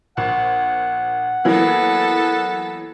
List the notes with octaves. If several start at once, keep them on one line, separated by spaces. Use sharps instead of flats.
A#1 F#5
E3 F#3 A#3 B3 A4